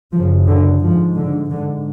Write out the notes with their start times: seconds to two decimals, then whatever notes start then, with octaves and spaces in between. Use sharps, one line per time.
0.13 F#2 C#3 F3
0.47 D3
0.82 G#2 F3
1.16 D3
1.50 G#2 D3